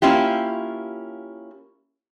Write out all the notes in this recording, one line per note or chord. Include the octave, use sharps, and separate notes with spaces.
A#3 C#4 E4 F4 G4